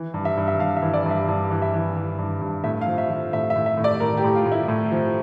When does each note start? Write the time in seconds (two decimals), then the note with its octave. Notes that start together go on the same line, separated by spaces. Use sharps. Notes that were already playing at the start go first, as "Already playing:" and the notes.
Already playing: E3
0.14 G2
0.25 E5
0.37 G2
0.48 E5
0.59 G2 F5
0.77 E5
0.82 E3
0.94 D5
1.06 G2 E5
1.28 G2
1.50 E3
1.62 E5
1.73 E3
1.97 E3
2.18 G2
2.42 G2
2.64 A2 E5
2.81 F5
2.87 F3
2.98 E5
3.10 F3
3.33 A2 E5
3.50 E5
3.56 A2
3.66 E5
3.77 A2
3.84 D5
4.00 A2 A#4
4.17 G4
4.24 A2
4.35 F4
4.46 A2
4.52 E4
4.68 A2
4.92 F3